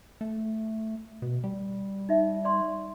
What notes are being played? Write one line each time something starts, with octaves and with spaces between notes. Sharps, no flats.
A3
B2
G3
D#4 E5
D5 C6 C#6